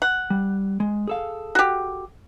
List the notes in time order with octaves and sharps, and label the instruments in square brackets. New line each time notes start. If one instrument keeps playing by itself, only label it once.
[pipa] F#5
[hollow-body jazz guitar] G3
G#3
G#4 A4 F5
[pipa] F#4 G4